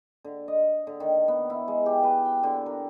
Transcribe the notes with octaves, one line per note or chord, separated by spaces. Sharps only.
D3
D#5
D3
D#3
B3
E4
G#3
G4
B4
G5
D3
A#4